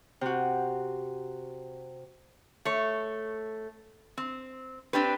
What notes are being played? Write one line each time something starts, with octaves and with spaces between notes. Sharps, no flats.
C3 F#4
A3 C#5
C4
C4 D4 G4 B4